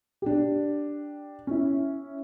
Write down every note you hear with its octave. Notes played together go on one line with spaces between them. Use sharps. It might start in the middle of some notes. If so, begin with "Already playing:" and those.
D4 G4
C#4 E4